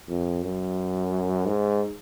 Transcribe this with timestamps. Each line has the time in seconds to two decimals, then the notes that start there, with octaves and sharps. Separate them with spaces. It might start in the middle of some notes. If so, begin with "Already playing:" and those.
0.08 F2
0.43 F#2
1.46 G#2